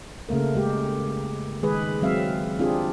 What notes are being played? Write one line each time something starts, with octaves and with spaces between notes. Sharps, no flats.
C#3 A3 A#3 A#4
G#3 G4
D#3 G#3 G#4 B4
F#3 G#3 C4 E5 F5
C4 D4 F4 G4 G#4